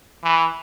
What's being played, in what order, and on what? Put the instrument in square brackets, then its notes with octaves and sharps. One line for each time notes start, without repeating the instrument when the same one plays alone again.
[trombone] E3